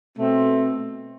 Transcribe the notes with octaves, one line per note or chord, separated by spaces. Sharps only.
B2 A3 C4